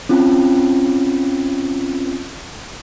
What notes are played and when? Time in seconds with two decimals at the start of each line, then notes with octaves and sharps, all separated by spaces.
0.09 C4 C#4 F4